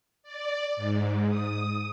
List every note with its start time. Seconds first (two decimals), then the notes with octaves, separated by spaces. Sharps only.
0.23 D5
0.76 G#2
1.29 D#6